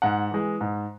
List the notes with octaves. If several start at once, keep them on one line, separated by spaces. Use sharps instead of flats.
G#2 F#5
E3 G#3
G#2